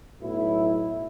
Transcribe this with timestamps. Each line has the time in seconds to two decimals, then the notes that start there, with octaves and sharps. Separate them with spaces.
0.20 B1 A2 F#3 A3 E4